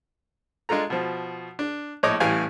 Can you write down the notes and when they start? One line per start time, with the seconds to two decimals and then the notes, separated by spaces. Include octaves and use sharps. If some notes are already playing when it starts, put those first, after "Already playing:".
0.69 G#3 D4 F4 A4 A#5
0.90 B2 F3
1.59 D4
2.03 A#1 A2 C#5 D#5 D6 D#6
2.20 A1 A2 E3 G3 F5 G#5